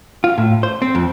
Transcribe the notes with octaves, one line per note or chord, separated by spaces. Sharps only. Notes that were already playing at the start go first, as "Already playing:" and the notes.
F4
A2
C5
C4
F2